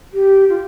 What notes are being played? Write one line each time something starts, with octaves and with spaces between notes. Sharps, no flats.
G4
F4